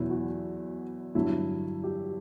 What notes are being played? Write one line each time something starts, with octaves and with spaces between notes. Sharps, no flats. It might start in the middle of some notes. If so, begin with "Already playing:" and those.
Already playing: E2 B2 F#3 E4
F#4
G2 D3 F#3 E4
G4